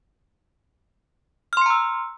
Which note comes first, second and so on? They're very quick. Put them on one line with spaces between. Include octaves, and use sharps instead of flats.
F6 C6 C#7 A#5 E6